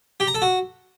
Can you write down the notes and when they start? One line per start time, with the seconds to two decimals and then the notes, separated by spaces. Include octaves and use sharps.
0.20 G4
0.27 A#5
0.35 A4
0.42 F#4